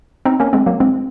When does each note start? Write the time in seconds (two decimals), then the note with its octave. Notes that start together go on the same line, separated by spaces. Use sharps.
0.25 C4 D#4
0.40 A#3 C#4
0.53 G#3 C4
0.66 F#3 A#3
0.80 G#3 C4